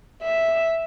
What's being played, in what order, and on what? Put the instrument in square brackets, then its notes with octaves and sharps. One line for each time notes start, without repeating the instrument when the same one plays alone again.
[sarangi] E5